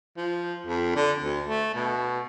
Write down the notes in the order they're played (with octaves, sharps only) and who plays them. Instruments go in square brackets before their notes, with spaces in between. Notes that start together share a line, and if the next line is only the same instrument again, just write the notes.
[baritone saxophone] F3
F2
D3
D2
A3
B2